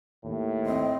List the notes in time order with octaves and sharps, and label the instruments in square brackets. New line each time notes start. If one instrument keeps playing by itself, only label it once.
[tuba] D#2 [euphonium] A2
[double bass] C4 [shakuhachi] D#5